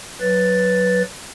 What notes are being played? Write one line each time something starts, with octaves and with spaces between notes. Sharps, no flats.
F#3 B4 A6